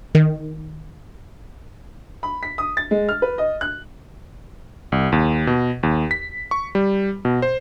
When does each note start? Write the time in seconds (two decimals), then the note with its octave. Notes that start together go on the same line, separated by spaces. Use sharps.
0.15 D#3
2.23 B5
2.43 B6
2.58 D#6
2.77 A6
2.91 G#3
3.09 F6
3.22 B4
3.38 D#5
3.61 F#6
4.92 C2
5.12 D#2
5.47 B2
5.83 D#2
6.11 B6
6.51 C#6
6.75 G3
7.25 B2
7.42 C5